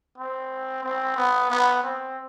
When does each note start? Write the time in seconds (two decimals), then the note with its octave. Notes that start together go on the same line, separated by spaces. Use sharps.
0.18 C4
0.83 C4
1.16 B3
1.50 B3
1.83 C4